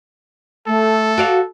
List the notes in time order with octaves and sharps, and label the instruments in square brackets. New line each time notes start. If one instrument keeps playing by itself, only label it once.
[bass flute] A3 [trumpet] A4
[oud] F#4 D5 F5